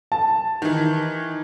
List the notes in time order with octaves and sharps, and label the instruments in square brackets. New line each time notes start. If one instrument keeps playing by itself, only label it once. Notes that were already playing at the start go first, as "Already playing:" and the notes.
[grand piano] A5
[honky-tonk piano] D#3 E3